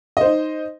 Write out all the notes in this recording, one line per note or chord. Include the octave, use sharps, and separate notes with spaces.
D#4 C5 D#5